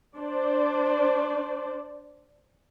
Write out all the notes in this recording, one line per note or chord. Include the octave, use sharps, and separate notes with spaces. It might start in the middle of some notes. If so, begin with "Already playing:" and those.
D4 C5 D5